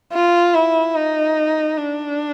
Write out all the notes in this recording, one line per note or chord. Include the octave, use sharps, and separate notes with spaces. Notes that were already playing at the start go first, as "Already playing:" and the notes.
F4
E4
D#4
D4